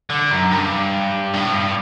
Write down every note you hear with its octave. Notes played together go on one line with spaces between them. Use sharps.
D3
F#2
G2
A2
G2